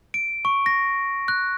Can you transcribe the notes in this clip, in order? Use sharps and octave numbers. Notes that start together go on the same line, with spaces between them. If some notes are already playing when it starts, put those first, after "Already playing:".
D7
C#6
A#6
F#6